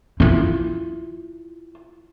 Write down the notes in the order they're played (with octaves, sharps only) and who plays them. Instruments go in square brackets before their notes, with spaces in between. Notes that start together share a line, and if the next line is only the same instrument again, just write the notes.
[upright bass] E4 F4